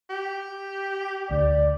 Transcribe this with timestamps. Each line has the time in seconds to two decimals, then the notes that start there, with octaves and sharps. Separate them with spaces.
0.10 G4
1.31 D2 D5